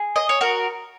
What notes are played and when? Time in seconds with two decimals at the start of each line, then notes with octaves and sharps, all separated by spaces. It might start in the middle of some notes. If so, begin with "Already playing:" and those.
Already playing: G#4
0.16 D#5
0.29 C#5
0.41 F#4 A#4